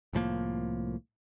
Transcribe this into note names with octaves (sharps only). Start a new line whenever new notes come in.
C2 A2 F3 A#3